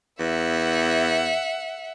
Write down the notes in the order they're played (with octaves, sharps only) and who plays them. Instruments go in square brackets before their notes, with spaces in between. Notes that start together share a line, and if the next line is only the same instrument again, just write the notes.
[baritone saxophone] E2 [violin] E5 F#5